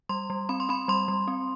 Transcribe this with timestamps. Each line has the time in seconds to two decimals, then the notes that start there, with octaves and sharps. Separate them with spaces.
0.09 G3 C6
0.30 G3
0.49 C4 B5
0.60 C6
0.69 C4 B5
0.88 G3 C6
1.08 G3
1.28 C4